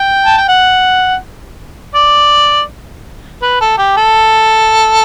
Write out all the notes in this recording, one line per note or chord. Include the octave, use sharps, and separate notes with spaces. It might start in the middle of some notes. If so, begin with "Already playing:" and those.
Already playing: G5
A5
G5
F#5
D5
B4
A4
G4
A4